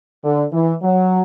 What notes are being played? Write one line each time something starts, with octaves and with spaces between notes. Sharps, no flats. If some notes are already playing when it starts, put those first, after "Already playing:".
D3
E3
F#3